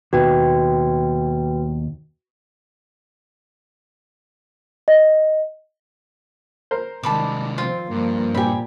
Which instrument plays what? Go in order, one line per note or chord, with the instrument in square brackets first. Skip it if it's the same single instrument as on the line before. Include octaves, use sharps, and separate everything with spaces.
[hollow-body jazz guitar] D#2 B2 [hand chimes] F#4 B4 G5
[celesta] D#5
[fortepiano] A#4 C5
[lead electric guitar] C3 G#3 [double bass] D#3 G3 [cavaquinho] A5 B5 D6
[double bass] F3 C4 [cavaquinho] F4
[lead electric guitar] G2 [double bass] F3 A#3
[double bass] A#2 [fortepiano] C4 G4 [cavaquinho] G#5 B5